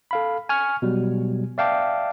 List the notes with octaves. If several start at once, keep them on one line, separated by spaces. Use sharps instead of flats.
A4 F5 B5
G#5 C#6 F6
B2 F#3 G3
D5 E5 F5 G5 A5 D6